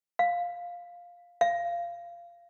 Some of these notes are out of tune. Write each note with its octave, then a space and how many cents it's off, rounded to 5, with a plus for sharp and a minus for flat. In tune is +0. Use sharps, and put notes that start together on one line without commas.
F5 +5
F5 -20